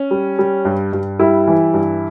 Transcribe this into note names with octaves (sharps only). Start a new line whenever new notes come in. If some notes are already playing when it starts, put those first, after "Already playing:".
Already playing: C#4
G3
G3
G2
G2
G3 E4
E3
G2